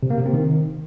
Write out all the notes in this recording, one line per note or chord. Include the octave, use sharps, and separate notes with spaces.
C3
A#3
C3
C4
D#3